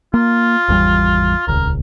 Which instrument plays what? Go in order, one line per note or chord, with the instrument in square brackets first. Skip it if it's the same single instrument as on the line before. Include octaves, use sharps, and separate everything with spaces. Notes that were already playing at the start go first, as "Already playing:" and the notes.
[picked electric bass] A#3 [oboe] F4
[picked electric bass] G#1 E2 G3
[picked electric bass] D#1 C#2 [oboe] A#4